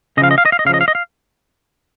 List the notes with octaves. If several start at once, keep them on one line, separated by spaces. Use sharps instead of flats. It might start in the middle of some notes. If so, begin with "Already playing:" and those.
C#3 F3 D#5 F5
D#5
F5
D#5
F5
D#5
C#3 F3 D#5 F5
F5
D#5
F5